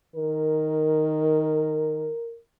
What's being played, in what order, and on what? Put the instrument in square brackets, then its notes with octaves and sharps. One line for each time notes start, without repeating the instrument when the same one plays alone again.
[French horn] D#3 [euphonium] A#4